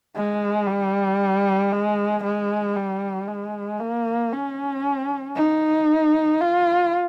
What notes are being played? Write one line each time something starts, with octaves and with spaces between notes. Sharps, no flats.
G#3
G3
G#3
G#3
G3
G#3
A#3
C#4
D#4
F4